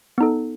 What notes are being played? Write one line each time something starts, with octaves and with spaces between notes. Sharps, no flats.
B3 D#4 A4